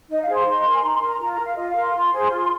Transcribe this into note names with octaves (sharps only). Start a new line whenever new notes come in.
D#4 D#5
F5
G#4 C5
C6
D#4
A#4
G#5
D#4 A#5
C6
A#4
A#5
F4 A#5
A#5
A#4
F5
F4 D#5
F5
A#4
C6
F4
G#4 C5
F4